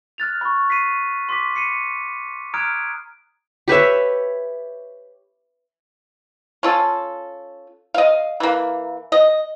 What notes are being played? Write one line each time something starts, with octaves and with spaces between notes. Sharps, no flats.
F6 F#6 A6 F7
B5 C#6
B6 C7 D#7
C6 D6 B6
C7 C#7 D#7
A#5 D#6 F6 F#6 G#6 D7
G4 B4 C#5 E5
C#4 F4 A4
D#5 F5
E3 A#3
D#5